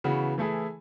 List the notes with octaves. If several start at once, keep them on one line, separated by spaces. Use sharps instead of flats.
C#3 E3 B3 F#4
E3 A3 E4 G#4